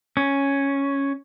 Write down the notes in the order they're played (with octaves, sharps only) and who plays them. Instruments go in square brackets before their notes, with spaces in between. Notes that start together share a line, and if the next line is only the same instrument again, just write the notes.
[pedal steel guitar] C#4